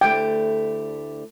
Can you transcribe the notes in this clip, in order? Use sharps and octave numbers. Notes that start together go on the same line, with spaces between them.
D2 D3 A3 E4 G4 G5